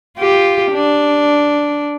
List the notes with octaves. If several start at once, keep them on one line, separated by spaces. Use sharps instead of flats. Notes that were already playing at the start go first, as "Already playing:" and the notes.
F4 G4
D4